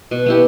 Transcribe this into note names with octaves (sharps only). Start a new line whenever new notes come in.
B2
B3 E4 G4